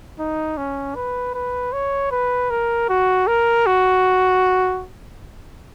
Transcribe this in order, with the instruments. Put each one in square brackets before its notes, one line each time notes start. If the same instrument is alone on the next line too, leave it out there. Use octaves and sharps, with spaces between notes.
[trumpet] D#4
C#4
B4
B4
C#5
B4
A#4
F#4
A#4
F#4